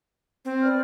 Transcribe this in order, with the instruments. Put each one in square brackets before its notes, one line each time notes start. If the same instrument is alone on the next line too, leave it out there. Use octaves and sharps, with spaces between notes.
[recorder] C4
[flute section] B4 D5 F6